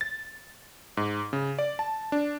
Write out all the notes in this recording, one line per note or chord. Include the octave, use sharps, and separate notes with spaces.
A6
G#2
C#3
D5
A5
D4